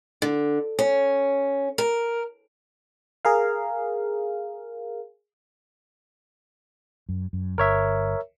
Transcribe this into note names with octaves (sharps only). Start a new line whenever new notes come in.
D3
C#4
A#4
G#4 A#4 F5
F#2
F#2
G1 A#4 C#5 E5